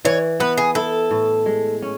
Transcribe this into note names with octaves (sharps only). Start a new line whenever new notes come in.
E3 C#5
B3 B4
G#4
E4 A4
A2
G#3
C#4